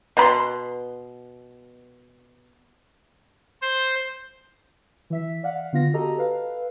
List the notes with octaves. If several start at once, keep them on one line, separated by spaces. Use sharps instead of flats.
B2 B5 C6
C5
E3 E5 B6
D5 F5 F#5
D3 B3 F4 F5 A#6
F#4 G4 A4 D#5 A#5
A4 B4 F5